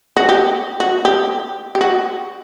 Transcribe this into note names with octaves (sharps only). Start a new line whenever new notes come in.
F#4
G4
F#4
G4
G4
F#4